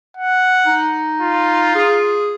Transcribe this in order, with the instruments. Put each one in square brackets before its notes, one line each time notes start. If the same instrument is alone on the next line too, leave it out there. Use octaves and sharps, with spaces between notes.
[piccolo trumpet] F#5
[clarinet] D#4
[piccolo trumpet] F4
[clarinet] G#4